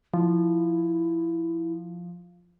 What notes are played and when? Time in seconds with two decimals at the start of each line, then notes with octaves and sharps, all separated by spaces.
0.14 F3 E4